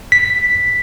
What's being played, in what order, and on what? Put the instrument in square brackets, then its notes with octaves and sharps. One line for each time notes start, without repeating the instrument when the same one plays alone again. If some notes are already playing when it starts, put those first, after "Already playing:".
[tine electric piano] B6